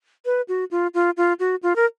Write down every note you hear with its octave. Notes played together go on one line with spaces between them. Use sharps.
B4
F#4
F4
F4
F4
F#4
F4
A#4